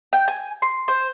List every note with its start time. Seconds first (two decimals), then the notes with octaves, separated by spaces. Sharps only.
0.13 G5
0.28 G#5
0.62 C6
0.88 C5